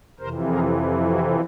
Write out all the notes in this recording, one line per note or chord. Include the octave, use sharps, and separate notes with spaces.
F2 C3 E3 A#4 C5
G#4 A#4
E4 F#4